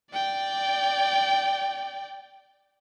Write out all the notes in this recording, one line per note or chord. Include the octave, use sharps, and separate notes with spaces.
D5 G5